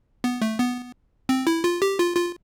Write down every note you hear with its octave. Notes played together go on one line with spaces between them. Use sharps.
B3
A3
B3
C4
E4
F4
G4
F4
F4